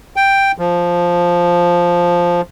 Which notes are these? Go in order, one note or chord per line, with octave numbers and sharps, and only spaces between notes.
G5
F3